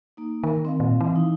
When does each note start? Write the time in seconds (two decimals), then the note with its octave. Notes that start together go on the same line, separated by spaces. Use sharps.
0.17 A#3 D#4
0.43 D#3 A#4
0.65 C4 D#5 F5
0.80 A#2
1.01 E3
1.16 D#4 E4